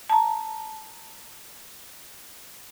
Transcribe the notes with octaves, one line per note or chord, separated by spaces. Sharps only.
A5 A#5